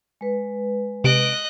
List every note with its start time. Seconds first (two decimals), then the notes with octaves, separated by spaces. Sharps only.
0.21 G#3 B4
1.04 C3 D#5 F#6 D7